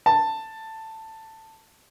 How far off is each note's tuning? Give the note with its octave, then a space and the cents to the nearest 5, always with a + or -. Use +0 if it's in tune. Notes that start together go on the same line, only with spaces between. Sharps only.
A5 +10